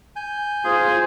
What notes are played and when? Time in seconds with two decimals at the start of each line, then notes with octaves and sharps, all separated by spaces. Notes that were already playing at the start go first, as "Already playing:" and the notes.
0.16 G#5 G6
0.65 F4 G#4 C5